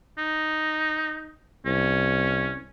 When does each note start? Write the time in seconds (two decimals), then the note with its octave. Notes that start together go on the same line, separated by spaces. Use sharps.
0.18 D#4
1.66 C2 C#4